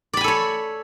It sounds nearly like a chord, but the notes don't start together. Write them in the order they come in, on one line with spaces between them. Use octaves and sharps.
D5 B5 G#5 A4 C#5